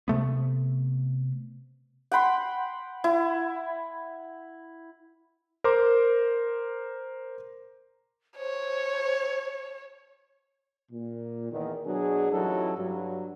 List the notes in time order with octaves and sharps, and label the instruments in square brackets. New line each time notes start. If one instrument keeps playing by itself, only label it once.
[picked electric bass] C3 A3 B3
[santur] F#5 G5 B5 C6
E4
[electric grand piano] A#4 C5 A#5 C6 D6
[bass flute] C5 [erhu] C#5
[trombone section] A#2
E2 D#3
B2 F#3 D4 G#4
A1 F#3 G3 D#4 E4 A4
G2 F#3